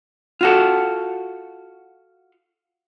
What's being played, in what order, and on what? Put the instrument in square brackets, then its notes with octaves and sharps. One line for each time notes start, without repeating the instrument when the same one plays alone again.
[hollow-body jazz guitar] F4 F#4 A4